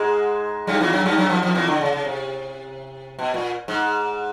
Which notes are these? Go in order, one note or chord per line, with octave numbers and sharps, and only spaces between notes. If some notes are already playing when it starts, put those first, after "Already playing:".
Already playing: G#2 G#3
G2 G3
E2 E3
F#2 F#3
G2 G3
F#2 F#3
F2 F3
F2 F3
E2 E3
D3
C#3
C#3
C3
B2
A#2
G#2